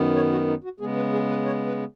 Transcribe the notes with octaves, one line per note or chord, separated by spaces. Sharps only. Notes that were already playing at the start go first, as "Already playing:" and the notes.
Already playing: F#2 D#3 B3
C#5
F#4
D#4
F#4
C#3 G#3 B3 G#4
B4
G#4
B4
C#5
B4